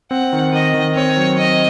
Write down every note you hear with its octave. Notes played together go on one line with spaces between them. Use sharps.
C4 F#5
D#3
D#3 D#5
D#3
C4 C#5
F#3
C4 D#5